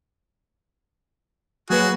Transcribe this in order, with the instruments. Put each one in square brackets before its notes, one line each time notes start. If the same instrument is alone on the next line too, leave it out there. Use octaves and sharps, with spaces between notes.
[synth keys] F#3 A#3 B4 [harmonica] F#4 G#4